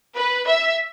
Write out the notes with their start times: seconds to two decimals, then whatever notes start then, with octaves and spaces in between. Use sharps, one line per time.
0.16 B4
0.46 E5